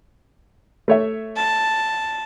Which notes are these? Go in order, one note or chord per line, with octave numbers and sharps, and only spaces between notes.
A3 C#5 E5
A5